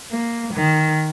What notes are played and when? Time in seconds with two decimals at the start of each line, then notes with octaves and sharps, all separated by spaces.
0.12 A#3
0.54 D#3